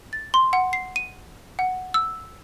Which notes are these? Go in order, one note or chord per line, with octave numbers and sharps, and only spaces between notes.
A6
C6
F#5
C7
D#7
F#5
E6